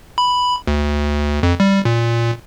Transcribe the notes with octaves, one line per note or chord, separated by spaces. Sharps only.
B5
D2
F2
G3
A#2